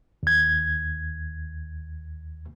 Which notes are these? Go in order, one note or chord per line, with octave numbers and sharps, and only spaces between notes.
D#2 G#6